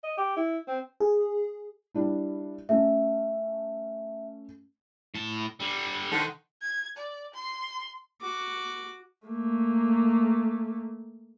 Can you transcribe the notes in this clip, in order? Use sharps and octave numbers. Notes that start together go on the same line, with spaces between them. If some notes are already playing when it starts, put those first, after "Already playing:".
D#5
G4
E4
C4
G#4
G3 D4 E4
A3 C#4 E5
A2 A5
D3 G3
D3 D#3 C5 F#5
G#6
D5
C6
F#4 D6
A3 A#3